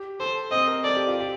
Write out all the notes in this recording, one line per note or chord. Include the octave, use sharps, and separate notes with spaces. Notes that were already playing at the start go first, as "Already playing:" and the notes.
Already playing: G4
A4 C5
C4 D#5
A#4
A4 D5
G4
F4
G4